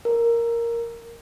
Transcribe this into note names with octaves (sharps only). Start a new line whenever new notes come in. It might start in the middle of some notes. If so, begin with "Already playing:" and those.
A#4